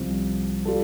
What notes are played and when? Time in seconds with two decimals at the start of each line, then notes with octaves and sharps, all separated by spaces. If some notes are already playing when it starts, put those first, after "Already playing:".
Already playing: C2 C3 F3 C4
0.65 G3 F4 A4